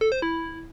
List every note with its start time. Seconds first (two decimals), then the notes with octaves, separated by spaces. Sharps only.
0.01 A4
0.12 C5
0.22 E4